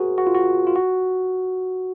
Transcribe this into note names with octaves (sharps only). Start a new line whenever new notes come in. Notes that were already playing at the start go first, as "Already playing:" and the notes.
Already playing: F#4 G#4 A#4 C5
F#4
F4
F#4
F4
F#4